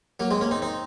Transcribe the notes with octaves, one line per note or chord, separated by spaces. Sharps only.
F#3 A#3
G#3 C4
A#3 C#4
C4 D#4
C4 D#4